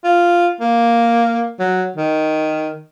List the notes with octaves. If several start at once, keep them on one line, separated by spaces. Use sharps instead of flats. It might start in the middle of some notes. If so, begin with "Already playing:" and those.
F4
A#3
F#3
D#3